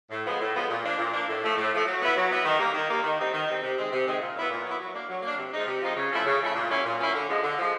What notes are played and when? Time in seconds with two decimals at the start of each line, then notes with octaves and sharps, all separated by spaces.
0.10 A2
0.25 F3 G#3 B3
0.40 A2
0.55 F3 G#3 B3
0.69 A#2
0.84 F3 A#3 D4
0.98 A#2
1.13 F3 A#3 D4
1.28 A2
1.42 F3 A3
1.57 A2
1.72 F3 A3
1.86 F#3
2.01 B3 E4
2.16 F#3
2.31 B3 E4
2.44 D#3
2.59 G3 A#3
2.74 D#3
2.89 G3 A#3
3.04 D#3
3.18 G3 C4 D#4
3.33 D#3
3.47 G3 C4 D#4
3.62 C3
3.77 D#3 G#3 C4
3.91 C3
4.06 D#3 G#3 C4
4.20 A#2
4.35 F#3 B3 E4
4.50 A#2
4.64 F#3 B3 E4
4.80 F#3
4.94 A#3 D4
5.09 F#3
5.22 A#3 D4
5.38 C3
5.52 F3 G#3 C4 D#4
5.67 C3
5.81 F3 G#3 C4 D#4
5.96 C#3
6.11 F3 A3 C#4 E4
6.25 C#3
6.41 F3 A3 C#4 E4
6.55 A#2
6.70 F#3 A#3 C#4 E4
6.84 A#2
6.99 F#3 A#3 C#4 E4
7.14 D3
7.28 F3 G#3
7.43 D3
7.57 F3 G#3